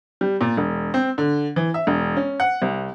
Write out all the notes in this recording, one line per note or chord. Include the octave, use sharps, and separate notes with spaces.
G3
A#2
E1
C4
D3
E3
E5
E1
C#4
F#5
C2